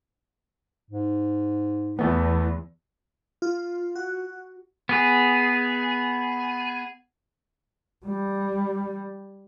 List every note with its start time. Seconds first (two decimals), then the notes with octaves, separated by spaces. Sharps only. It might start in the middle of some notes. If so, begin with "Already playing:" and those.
0.90 G#2
1.99 E2 E3 A3 B3
3.42 F4
3.95 F#4
4.89 B3 G#4
8.05 G3